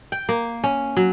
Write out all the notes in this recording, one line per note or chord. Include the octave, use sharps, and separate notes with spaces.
G5
A#3
C#4
F#3